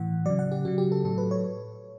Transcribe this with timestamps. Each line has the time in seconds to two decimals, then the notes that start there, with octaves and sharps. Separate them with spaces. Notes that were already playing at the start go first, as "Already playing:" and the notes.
Already playing: A2 E3 F#5
0.26 C#3 F#3 D5
0.39 F#5
0.52 G4
0.65 C#3 F#3 F#4
0.78 G4
0.92 A4
1.05 A2 F#3 A4
1.18 B4
1.31 C#5